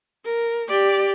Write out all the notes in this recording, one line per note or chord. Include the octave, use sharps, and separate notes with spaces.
A#4
G4 D5